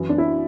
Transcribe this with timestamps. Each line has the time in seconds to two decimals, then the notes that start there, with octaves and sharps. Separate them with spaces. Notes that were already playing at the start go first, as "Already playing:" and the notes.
Already playing: F#2 E3
0.09 D4
0.18 E4